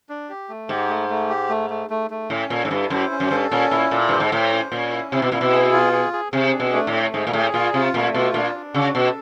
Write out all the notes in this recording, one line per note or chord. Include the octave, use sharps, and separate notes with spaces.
D4
G4
A3
G#2 G4
A3
A3
G4
A3
A3
A3
A3
A2 C#4
A#2 A4
G#2
G2 E4
F#2 C5
C#4
F#2
G2 A4
A#2 C#4
A#2 E4
A#2 A4
G2 C5
G#2
A2 C5
C#4
A#2 C#4
E4
C3 E4
B2
A#2 E4
B2
G#4
F4
G#4
G#4
C3 G#4
D4
B2
A3
A2
A3
G#2 G#4
A#2
A2 G#4
A#2 F4
C3 F4
A#2 A3
B2 F4
A#2 D4
D4
C#3 F#4
B2 A4